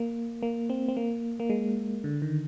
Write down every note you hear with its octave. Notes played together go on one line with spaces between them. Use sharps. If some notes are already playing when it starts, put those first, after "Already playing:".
Already playing: A#3
A#3
C4
C4
A#3
A#3
G#3
D3
D#3